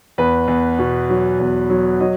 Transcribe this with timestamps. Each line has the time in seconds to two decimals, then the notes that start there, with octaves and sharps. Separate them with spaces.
0.18 E2 B4
0.48 E2
0.79 B2
1.10 F#3
1.40 E2
1.70 F#3
2.00 F#3 D#5